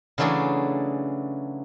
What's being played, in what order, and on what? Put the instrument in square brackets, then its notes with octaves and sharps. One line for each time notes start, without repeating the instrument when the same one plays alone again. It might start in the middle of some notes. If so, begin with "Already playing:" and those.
[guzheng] C#3 E3 F#3 A3 D4 G#4